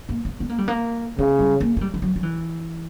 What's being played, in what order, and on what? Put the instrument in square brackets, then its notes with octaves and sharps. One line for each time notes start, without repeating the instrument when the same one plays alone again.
[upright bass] A#3
B3
B3
A#3
G3
A#3
[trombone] C#3 [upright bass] B3
[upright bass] G3
A#3
A#3
G3
E3
F#3
F#3
E3